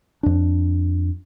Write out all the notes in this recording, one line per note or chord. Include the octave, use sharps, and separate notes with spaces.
F2 D4